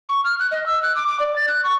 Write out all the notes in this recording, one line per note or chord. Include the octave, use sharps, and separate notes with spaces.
C#6
F6
F#6
D#5
E6
F#6
D6
D6
D5
A6
F#6
C#6